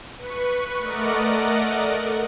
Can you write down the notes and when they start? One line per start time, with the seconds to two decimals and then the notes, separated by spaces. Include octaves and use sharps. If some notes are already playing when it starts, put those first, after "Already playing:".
0.16 B4 C#6
0.79 A3 A#4 D5 D#5 F#5